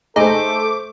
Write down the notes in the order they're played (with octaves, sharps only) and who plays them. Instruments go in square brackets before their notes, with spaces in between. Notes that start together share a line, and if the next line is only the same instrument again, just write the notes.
[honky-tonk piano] A3 C5 [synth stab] D#4 G#4 [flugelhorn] A4 [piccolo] D6